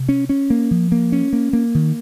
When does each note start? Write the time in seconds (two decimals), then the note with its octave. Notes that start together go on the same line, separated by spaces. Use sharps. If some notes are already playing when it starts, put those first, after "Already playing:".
Already playing: C3
0.09 C#4
0.29 C#4
0.50 A#3
0.71 F3
0.92 A#3
1.12 C#4
1.33 A#3
1.53 A#3
1.75 D#3